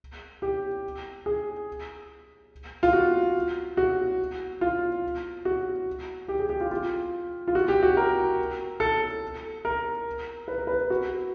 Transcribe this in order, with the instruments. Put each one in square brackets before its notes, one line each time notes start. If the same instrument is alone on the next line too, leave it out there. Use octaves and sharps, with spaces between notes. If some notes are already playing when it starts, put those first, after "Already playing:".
[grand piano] G4
G#4
F4
F#4
F#4
F4
F#4
G4
G#4
G4
F4
F4
F4
F#4
G4
F#4
A#4
A4
A#4
B4
A#4
B4
F#4